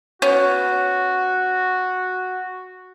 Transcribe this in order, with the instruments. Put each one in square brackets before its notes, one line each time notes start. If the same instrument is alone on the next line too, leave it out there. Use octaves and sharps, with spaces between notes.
[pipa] B3 C#4 [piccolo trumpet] F#4